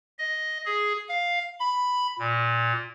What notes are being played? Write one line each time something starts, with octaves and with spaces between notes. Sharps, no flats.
D#5
G#4
F5
B5
A#2